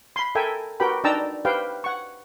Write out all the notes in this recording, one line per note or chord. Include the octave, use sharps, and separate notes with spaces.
B5 C6
A4 A#4 E5 G5 G#5
F#4 G4 A#4 B4 G5 B5
D4 D#4 G5 A5 A#5 E6
G4 B4 C5 F5 G5
F#5 C#6